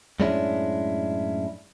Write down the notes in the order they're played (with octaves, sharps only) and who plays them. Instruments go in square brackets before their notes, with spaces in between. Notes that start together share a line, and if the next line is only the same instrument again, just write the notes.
[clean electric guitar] F#2 A2 G#3 C#4 D4 E4